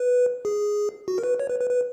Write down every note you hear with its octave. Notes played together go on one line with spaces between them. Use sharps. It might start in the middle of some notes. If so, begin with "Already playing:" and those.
Already playing: B4
G#4
F#4
A#4
B4
C#5
B4
B4
B4